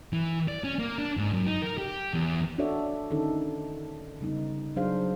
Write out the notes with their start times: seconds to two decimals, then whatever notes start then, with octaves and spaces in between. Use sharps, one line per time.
0.13 E3
0.48 D5
0.64 C#4
0.79 A#3
0.98 D4
1.17 G#2
1.33 F#2
1.46 D#4
1.62 A#4
1.78 G4
2.14 E2
2.58 D4 F#4 A4 C#5 D5 E5
3.11 D3 D#3 C#4 D#4 A4
4.21 C#3 G3 B3 D#4
4.76 F#3 D4 G#4 C5 F5